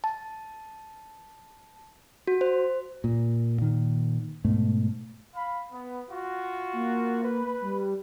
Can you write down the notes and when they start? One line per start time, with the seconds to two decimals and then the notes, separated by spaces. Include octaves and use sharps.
0.04 A5
2.27 F#4
2.41 C5
3.04 A#2
3.58 A#2 D#3
4.44 G#2 B2 A3
5.34 F5 B5
5.71 B3
6.10 F4 F#4
6.73 A#3
7.24 B4
7.61 G3